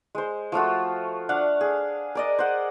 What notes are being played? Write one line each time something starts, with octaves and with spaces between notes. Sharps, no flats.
G#3 C5
F3 A3 F4 F#4
D4 F5 F#5
G#4
A#4 D5 D#5
C5 F#5